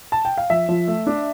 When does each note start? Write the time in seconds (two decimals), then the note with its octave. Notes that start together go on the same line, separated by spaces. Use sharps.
0.12 A5
0.25 G5
0.37 F5
0.50 F3 E5
0.69 F3
0.88 A3
1.07 D4